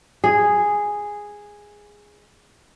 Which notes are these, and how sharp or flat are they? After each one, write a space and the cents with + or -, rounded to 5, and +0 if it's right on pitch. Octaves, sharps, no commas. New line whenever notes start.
G#4 -5